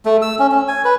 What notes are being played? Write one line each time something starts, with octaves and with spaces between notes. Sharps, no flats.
A3
E6
C#4
C#4
G#5
B4